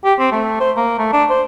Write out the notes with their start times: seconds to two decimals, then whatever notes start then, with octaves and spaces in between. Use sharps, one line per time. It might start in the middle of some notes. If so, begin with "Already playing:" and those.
0.05 G4
0.19 C4
0.32 A3
0.60 C5
0.77 A#3
0.99 A3
1.13 D4
1.30 C5